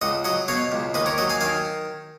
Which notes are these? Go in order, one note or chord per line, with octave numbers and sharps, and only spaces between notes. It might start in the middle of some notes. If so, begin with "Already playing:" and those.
C#2 D#5 F#5
F#3 D#5 F#5
B2 C#5 F5
C#2
D#2 B4 D#5
A#4 C#5
F#3 D#5 F#5
F5 G#5
D#3 F5 G#5